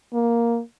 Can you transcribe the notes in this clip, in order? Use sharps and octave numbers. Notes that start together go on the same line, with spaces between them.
A#3